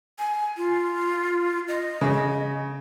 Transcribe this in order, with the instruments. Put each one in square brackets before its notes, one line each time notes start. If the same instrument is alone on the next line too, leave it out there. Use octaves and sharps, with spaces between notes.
[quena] G#5
F4
D#5
[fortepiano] C#3